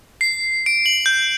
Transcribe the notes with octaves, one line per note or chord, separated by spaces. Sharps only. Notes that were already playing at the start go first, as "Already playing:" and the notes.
C7
D7
F#7
G6